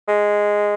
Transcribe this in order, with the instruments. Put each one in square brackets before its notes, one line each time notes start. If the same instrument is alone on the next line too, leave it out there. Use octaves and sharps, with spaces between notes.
[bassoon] G#3